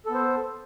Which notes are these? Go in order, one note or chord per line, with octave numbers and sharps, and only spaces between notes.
B3 A4 C5